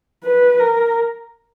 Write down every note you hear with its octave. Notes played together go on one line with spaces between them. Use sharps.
B4
A#4